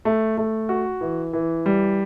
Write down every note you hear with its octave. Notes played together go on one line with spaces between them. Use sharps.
A3
A3
F#4
E3
E3
G3